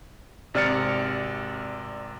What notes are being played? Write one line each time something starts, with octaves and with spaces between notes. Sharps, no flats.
G#1 C3 D5 F6 A6 C#7